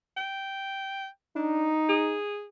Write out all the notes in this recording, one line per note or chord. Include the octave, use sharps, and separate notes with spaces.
G5
D4 D#4
G#4